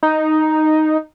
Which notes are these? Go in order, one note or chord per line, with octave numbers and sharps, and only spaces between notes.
D#4